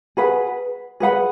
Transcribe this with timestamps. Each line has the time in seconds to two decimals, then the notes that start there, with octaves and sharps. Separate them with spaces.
0.17 G#4 B4 F#5 B5
1.00 G#4 B4 F#5 B5